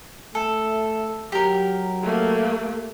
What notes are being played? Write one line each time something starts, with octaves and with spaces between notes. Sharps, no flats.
A3 A4
F#3 G4 A#4
A3 A#3